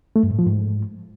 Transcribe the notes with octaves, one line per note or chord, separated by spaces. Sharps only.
A3
G2
A2
F3
G#2